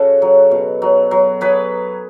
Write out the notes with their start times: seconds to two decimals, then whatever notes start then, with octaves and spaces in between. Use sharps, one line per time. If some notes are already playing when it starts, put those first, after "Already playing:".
Already playing: C#3 F#4 A4
0.22 F#3
0.51 B2
0.82 F#3
1.11 F#3
1.41 F#3 G#4 B4